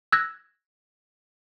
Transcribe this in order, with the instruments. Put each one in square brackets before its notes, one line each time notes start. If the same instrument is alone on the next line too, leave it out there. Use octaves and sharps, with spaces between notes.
[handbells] E6 F#6 G#6 A#6